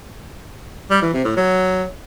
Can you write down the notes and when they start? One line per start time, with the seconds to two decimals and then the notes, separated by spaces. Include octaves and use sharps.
0.91 G3
1.02 E3
1.14 C3
1.25 A2
1.37 F#3